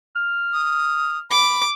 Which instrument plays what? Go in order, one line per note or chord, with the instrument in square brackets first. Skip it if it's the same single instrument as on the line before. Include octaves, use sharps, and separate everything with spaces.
[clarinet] F6
[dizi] D#6
[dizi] B5 [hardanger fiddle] D6